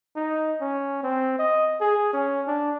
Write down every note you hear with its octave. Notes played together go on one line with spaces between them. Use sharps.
D#4
C#4
C4
D#5
G#4
C#4
D4